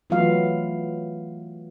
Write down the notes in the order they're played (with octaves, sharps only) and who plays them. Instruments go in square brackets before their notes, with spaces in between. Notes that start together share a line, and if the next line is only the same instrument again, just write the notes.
[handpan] E3 F#3 A3 B3 F4 F5